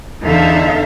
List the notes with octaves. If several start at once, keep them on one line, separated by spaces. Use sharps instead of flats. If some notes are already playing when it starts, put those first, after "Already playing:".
E2 D3 D#4 A4 E5 F5